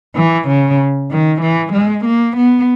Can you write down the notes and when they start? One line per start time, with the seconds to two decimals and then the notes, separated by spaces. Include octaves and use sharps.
0.16 E3
0.47 C#3
1.10 D#3
1.41 E3
1.72 G#3
2.04 A#3
2.36 B3